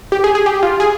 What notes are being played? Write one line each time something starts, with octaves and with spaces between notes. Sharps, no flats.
G4
G#4
G#4
G4
F4
G#4